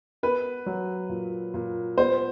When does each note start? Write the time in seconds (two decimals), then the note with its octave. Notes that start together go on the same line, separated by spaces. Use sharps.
0.23 B3 B4
0.66 F#3
1.09 A#2
1.54 A#2
1.98 B3 C5